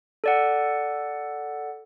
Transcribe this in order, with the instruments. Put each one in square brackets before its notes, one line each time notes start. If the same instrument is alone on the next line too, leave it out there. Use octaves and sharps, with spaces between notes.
[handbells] A4 D5 F#5